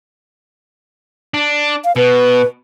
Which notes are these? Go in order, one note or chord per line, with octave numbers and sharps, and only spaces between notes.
D4
F5
B2 B4